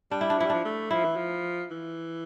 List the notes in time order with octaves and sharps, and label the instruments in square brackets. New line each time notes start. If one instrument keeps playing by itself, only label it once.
[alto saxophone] G3 [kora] D4
[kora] E4
D4
[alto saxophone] F3 [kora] E4
[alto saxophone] G3
[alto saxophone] F3 [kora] D4
[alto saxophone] A3
[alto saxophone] F3 [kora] E4
[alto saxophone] E3
F3
E3